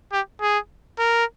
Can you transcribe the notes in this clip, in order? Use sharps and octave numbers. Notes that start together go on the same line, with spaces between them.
G4
G#4
A#4